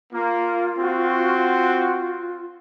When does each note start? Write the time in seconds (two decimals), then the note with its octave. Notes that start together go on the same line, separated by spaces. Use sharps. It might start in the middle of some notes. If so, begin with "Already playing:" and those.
0.13 A#3 F4
0.78 C4 F#4